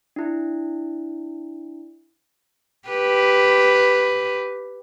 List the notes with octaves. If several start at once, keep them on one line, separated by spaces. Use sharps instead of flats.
D4 E4
G4 B4